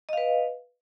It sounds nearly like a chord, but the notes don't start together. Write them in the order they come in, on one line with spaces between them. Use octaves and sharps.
D#5 F5 B4